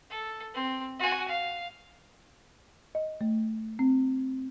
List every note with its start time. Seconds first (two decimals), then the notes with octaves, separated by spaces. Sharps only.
0.10 A4
0.54 C4
0.99 F#4 G#5
1.28 F5
2.95 D#5
3.21 A3
3.79 C4